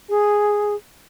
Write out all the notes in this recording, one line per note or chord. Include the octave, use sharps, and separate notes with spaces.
G#4